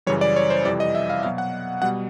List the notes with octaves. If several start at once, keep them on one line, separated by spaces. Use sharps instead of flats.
F#2 C#3 E3 G3 C#5
D5
C#5
C5
F2 C3 E3 G3 D5
D#5
E5
F5
B2 F#3 F5
F#5
B2 G3 F#5